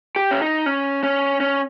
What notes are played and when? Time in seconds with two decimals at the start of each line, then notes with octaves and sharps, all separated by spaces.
0.16 G4
0.31 C#4
0.42 D#4
0.66 C#4
1.03 C#4
1.40 C#4